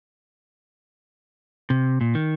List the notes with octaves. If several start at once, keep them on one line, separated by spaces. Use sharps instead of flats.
C3
A#2
D#3